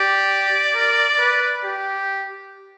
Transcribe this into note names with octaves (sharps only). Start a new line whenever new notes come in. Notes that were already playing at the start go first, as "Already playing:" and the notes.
Already playing: G4 D5
A#4
B4
G4